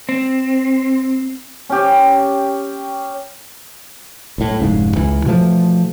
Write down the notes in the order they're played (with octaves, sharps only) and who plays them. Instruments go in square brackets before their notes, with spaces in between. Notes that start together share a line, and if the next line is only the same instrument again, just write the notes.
[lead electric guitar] C4
[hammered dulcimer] C#4 G4
[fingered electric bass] B1 A2
F1 G#2 C#3
C#2 E3
B2 E3 F3 A3